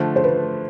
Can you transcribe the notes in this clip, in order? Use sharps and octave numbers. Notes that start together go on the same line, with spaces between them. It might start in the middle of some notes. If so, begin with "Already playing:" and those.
Already playing: D3 F3 A3 C5
C5
B4